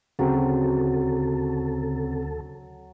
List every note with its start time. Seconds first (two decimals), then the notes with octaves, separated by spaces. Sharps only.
0.19 D2 C#3 F#3 C4 A4